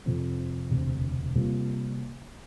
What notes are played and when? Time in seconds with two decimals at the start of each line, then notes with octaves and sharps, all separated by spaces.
0.06 F2 C3 F3
0.71 E1 D2 C3
1.35 C3 G3 A#3 F4